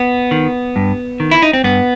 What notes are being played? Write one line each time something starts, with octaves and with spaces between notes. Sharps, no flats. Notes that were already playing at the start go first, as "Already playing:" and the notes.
Already playing: B3
D#3
G2
D#3
E4
D#4
C4
G2 B3